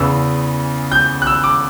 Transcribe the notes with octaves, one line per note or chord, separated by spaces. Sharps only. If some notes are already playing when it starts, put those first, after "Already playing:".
Already playing: E2 C#3 E3 E6
G6
F#6
E6
D6